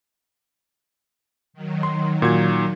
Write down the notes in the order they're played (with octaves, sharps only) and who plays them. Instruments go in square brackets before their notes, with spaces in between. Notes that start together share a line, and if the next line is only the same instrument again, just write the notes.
[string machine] D#3 F#3
[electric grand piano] C6
A#2 F#4 G#6